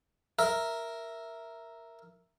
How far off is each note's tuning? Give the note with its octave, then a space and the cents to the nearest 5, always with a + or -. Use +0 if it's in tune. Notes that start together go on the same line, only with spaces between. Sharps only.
A#4 +0 E5 +0